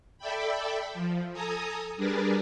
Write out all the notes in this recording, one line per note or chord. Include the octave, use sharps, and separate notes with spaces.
A4 D5 E5 G5 B5
F3
A4 G#5 A#5 D#6
G3 D4 G#4 A#4 B4 D5